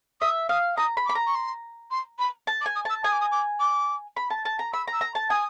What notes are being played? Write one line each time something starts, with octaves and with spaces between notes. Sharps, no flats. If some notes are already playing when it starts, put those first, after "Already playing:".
E5 D#6
F5 D#6
A#5 D#6
B5
D6
B5
A#5
C#6
C6
C6
B5
A5
D6
G#5
D#6
A5 E6
G#5 D#6
D6
D#6
D6
D6
B5
A5
A5
A#5
B5 E6
A#5
E6
A#5
A5
G#5 D#6